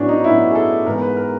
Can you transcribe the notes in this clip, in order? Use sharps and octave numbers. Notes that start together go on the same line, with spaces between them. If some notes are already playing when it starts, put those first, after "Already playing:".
Already playing: A2 F#3 B3 C#4 D4
D#4
A2 F#3 B3 E4
G#4
A4
G#2 E3 G#3 B3 A#4
B4
A#4